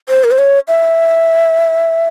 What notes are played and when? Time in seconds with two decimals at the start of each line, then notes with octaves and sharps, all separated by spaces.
0.09 C5
0.24 A#4
0.31 C5
0.38 C#5
0.68 E5